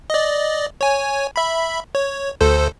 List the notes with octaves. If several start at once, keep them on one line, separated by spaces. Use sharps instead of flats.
D5 D#5
C#5 G#5
E5 B5
C#5
D2 A4 C5